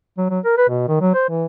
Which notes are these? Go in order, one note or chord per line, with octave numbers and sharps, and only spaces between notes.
F#3
F#3
A#4
B4
B2
D#3
F#3
C5
E3